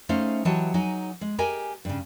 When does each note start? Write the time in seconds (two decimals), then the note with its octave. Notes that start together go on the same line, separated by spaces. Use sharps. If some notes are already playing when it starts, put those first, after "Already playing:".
0.09 A3 C#4 D#4 G#4 C5 F5
0.45 E3 F#3 G4 C#5 D#5 A5
0.74 F#3 D#4 G#4 G#5
1.21 G#3
1.38 G4 G#4 A#4 D#5 G#5
1.85 G2 C#3